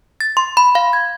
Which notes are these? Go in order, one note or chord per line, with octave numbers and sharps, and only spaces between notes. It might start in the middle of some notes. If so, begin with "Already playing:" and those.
A6
C6
B5
F5
G#6